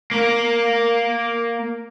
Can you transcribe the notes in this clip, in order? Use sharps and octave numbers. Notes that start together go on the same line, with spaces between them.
A#3 A#4